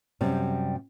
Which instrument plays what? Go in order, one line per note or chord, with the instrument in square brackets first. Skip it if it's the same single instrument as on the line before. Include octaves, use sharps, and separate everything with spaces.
[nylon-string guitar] F#2 C3 G3 C4